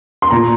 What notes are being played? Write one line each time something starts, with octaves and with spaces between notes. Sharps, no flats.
C6
A#2 A#5